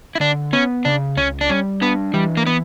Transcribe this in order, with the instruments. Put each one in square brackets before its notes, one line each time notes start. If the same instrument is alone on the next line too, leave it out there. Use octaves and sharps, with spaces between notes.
[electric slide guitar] E4
[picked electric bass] D3 [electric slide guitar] D4
[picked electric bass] B3 [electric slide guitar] C#4
[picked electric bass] C#3 [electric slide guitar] D4
[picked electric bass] C#2 [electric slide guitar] C#4
[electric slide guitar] D4
[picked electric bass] G3 [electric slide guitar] C#4
[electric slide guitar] B3 [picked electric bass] D4
[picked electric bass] E3 [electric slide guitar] G3
[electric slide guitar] A#3
B3